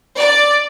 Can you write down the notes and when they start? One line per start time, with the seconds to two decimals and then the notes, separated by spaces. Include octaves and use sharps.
0.18 D5